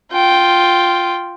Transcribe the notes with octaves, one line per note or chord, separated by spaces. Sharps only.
F4 G5